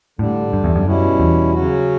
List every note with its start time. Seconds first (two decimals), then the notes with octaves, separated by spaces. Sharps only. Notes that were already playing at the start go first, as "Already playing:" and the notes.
0.19 A2 D3 G3 D4
0.53 G2
0.64 E2
0.75 F#2
0.86 B2 G3 C#4 E4
1.20 E2
1.53 C#3 F#3 C#4 F#4